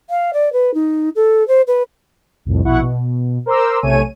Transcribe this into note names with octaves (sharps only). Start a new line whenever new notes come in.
F5
D5
B4
D#4
A4
C5
B4
C2 F2 A2
A#1 B2 E4 F#5 C#6
B2
A#4 C5 A#5 C6 D6 E6
B1 C3 A3 C#5 G#5 D#7